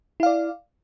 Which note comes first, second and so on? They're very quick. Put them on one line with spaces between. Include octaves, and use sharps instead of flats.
E4 F5 D5